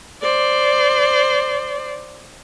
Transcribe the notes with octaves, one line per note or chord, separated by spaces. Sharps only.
C5 D5